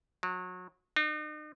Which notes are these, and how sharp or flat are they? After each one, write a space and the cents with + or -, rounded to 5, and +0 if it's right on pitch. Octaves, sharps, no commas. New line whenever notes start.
F#3 -30
D#4 -40